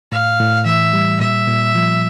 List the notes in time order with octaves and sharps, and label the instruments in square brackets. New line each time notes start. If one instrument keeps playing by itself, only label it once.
[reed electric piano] A2 [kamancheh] F5
[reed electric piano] A2
[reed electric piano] E3 [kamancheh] E5
[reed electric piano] G3
[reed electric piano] A#2 [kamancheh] E5
[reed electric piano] A#2
F3